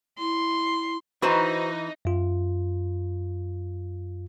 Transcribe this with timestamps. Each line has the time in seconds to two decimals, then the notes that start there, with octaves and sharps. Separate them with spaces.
0.19 E4 C6
1.22 E3 D#4 F#4 B4 C5 A#5 B5
2.05 F#2 F4